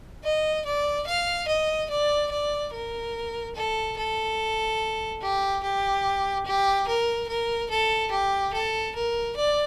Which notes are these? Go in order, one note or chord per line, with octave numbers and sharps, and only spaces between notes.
D#5
D5
F5
D#5
D5
D5
A#4
A4
A4
G4
G4
G4
A#4
A#4
A4
G4
A4
A#4
D5